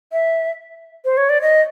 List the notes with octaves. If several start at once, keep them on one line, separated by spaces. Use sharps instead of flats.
E5
C5
C#5
D5
D#5